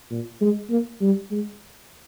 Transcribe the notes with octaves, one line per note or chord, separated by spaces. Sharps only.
A#2
G#3
A#3
G3
G#3